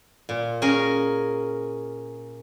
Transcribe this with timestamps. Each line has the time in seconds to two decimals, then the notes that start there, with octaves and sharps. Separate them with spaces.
0.29 A#2
0.62 C#4 G#4 A#4